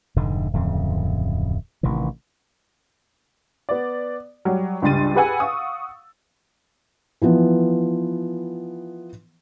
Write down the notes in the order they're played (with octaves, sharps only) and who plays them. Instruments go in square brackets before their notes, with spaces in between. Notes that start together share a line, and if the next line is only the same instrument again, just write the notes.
[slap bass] F1 G#2 D3
D1 F2 C#3
A1 C3 D#3 E3
[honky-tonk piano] B3 D5
F#3 G3
C#2 G2 G3 C6 A6 D#7
G4 G#4 B4 F#5 G#5 E6
F5 F#5 C#6 D#6 E6
[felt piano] E3 F3 B3